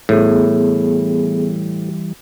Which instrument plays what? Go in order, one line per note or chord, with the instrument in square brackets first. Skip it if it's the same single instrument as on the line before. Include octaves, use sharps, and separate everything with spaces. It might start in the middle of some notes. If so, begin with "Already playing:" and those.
[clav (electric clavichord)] A2 [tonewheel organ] E3 G3 [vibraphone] B3 G#4